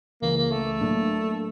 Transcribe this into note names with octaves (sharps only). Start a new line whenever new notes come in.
C#2 C#3 E3 A#3
A#3
A3
A2 F#3 A#3 D4